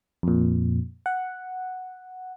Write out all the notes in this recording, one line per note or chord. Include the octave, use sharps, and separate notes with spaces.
F2 A#2
F#5